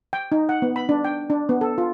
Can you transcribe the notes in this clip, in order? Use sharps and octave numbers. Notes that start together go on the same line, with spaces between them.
G5
D#4
F#5
B3
B5
D4
G5
D4
B3
A4
F4